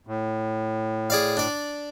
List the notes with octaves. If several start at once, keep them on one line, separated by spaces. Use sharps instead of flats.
A2
G#4 D5 F5
D4 D5